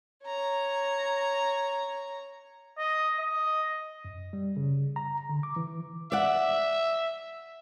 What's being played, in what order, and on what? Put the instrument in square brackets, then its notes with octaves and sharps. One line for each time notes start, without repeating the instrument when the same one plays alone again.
[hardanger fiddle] C#5 A#5
[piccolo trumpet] D#5
D#5
[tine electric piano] F#2
G3
C#3
A#5
D3
D6
E3
[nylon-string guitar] D5 F#5 [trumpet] E5